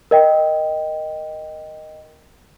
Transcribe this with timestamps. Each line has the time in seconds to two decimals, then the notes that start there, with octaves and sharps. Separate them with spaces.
0.11 A#4 D#5 G5